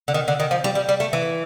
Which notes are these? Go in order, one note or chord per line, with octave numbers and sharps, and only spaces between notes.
D3
D#3
D3
D#3
F3
G3
G3
G3
A3
E3